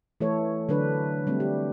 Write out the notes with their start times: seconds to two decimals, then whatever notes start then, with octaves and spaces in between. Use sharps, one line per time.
0.21 E3 A3 A4 C#5
0.69 D3 F#3 D4 B4
1.27 G3 A3 C4
1.40 G4